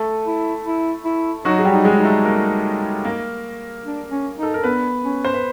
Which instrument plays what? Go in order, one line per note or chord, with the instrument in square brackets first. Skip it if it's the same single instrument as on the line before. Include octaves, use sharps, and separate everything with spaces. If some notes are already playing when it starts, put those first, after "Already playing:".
Already playing: [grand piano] A3 A4
[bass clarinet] E4
E4
E4
[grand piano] F#3 F#4 [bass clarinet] D#4
[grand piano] G#4
G3 G4
[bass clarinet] D#4
[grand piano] G#3 G#4
[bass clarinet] D#4
[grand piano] A3 A4
A#3 A#4
A#3 A#4
[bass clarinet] D4
C#4
D#4
[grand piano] A4
A#4
[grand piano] B3 B4 [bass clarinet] D4
[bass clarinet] C#4
[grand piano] C5
B4